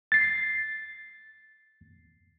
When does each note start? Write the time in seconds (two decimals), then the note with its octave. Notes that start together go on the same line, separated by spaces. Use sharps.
0.12 A6 C7